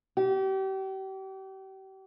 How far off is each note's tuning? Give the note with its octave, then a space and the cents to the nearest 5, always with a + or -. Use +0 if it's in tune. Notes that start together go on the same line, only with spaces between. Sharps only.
G4 -35